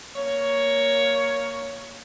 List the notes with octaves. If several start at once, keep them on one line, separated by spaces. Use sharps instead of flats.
A#3 C#5